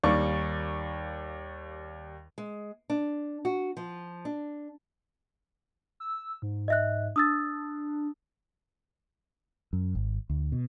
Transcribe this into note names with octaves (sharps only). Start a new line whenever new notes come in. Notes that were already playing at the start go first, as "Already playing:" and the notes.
D#2 G3 A#3 D5 C#6
G#3
D4
F#4
F3
D4
E6
G#2
D#5 E5 F#6
D4 D#6 E6 A6
F#2
G#1
D2
B2